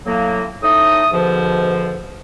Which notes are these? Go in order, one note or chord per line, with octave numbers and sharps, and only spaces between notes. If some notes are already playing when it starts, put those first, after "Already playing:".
A2 F#3 A#3
A2 A3 D#4 D#6
G#2 B2 D3 F3